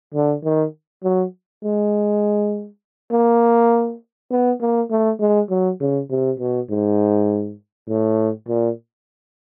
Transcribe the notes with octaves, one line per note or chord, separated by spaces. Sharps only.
D3
D#3
F#3
G#3
A#3
B3
A#3
A3
G#3
F#3
C#3
C3
B2
G#2
A2
A#2